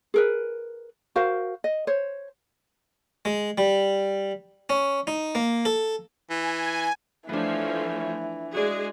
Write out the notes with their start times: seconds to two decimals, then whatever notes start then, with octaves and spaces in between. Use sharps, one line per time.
0.14 G#4 A#4 B4
1.16 F#4 A#4 C5 F5
1.64 D#5
1.87 C5 C#5
3.25 G#3
3.58 G3
4.70 C#4
5.07 D#4
5.35 A#3
5.65 A4
6.30 E3 G#5
7.29 E3 F3 A3 B3 D4 C#5
8.54 G#3 F#4 G#4 D5